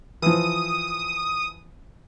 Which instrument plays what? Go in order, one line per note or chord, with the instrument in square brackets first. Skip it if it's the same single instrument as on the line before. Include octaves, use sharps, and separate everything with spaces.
[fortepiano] E3 F3 [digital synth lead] D#6